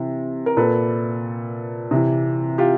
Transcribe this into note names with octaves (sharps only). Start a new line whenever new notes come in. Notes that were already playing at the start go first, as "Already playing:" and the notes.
Already playing: C3 E3
A#4
A#2 A4 B4
C3 E3
F4 G4